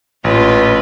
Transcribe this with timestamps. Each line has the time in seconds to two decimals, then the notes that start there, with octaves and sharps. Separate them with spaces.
0.24 A1 A#2 F4 B4